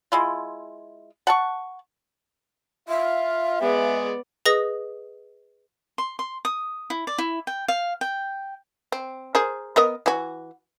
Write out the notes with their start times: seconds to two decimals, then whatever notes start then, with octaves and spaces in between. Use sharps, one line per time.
0.12 G#3 E4 F4
1.27 F#5 A5 C#6
2.88 F4 E5 F5
3.61 G#3 B3 G#4 D5
4.45 G#4 B4 D#5 D#6 A#6
5.98 C6
6.19 C6
6.45 D#6
6.90 E4
7.07 D5
7.18 E4
7.47 G5
7.68 F5
8.01 G5
8.92 C4
9.35 G#4 A#4 C5
9.76 B3 A#4 D#5
10.06 E3 F#4